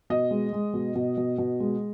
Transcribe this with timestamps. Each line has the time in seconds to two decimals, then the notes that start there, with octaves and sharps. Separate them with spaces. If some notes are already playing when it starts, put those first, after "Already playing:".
0.10 B2 D#5
0.31 G#3
0.53 G#3
0.74 B2
0.95 B2
1.17 B2
1.38 B2
1.60 G#3